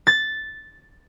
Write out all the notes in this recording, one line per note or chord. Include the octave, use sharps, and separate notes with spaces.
A6